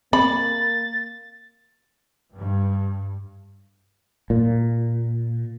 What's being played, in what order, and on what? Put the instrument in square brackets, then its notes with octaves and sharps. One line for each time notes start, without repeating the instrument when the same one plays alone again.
[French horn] A#3 [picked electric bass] C4 [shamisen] B5 [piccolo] A6
[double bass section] G2
[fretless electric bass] A#2